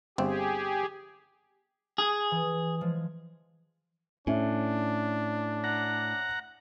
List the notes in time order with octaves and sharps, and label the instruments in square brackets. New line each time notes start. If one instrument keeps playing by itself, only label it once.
[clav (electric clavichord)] G1 C4 [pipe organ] G4 G#4
[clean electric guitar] G#4
[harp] E3
F3 G#3
[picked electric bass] A2 [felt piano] C#4 E5 [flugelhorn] D4
[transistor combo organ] F#5 A#5